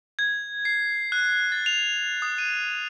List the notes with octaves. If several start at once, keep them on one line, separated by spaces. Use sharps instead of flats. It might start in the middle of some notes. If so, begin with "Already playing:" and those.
G#6
C7
F#6
A6
F7
D#6
D#7